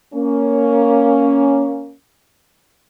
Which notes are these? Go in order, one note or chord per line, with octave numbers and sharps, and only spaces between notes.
A#3 C#4